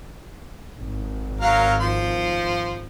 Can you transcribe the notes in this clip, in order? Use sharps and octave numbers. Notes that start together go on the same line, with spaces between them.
G#1
F#3 A#4 F5
F3 C6